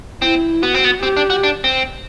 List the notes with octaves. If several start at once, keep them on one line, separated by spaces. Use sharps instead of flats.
C4 E4
B3 F#4
C4
B3
C4 G4
D4
F#4
D4
C4